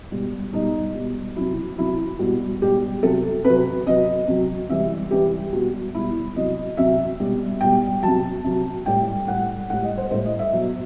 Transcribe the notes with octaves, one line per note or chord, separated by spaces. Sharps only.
B2 G3
B2 G3 D#4
B2 G3
C3 F#3 E4
C3 F#3 E4
B2 G3 F#4
B2 G3 G4
C3 F#3 A4
C3 F#3 B4
C3 F#3 D#5
C3 F#3
C3 E3 G3 E5
C3 E3 G3 G4
B2 G3 F#4
B2 G3 E4
C3 F#3 D#5
C3 F#3 E5
B2 G3
B2 G3 G5
C3 F#3 A5
C3 F#3
A2 G3 G5
A2 G3 F#5
A2 G3 F#5
D#5
C5
A2 G3 C5
D#5
E5
B2 F#3